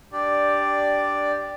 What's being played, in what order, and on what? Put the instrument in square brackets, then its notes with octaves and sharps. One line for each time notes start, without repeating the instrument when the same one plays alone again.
[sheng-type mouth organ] D4 G4 D5